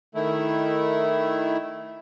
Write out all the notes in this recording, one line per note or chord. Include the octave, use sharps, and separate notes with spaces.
D#3 A3 E4